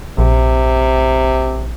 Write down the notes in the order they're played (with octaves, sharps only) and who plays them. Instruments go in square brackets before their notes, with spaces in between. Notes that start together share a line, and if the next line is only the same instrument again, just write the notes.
[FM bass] A#1 [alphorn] C3